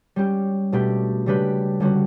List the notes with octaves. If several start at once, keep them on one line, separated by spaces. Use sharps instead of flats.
G3 C#4 G4
B2 A3 D4 G4 B4
C#3 G3 D4 G4 B4
D3 G3 C#4 F#4